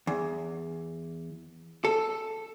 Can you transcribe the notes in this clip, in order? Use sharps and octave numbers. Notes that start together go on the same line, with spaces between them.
E2
A4